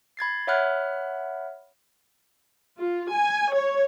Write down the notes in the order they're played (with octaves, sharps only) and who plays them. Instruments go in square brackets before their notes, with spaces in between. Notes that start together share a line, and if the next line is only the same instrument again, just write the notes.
[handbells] B5 G#6 A6 C7
C#5 E5 F#5 B5 F6 F#6
[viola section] F4
G#5
C#5